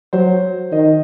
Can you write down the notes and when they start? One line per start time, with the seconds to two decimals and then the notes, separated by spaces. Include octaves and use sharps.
0.13 F#3 C5
0.72 D#3 D#5